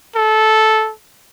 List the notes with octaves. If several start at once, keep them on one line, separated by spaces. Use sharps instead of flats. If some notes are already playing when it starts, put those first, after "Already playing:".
A4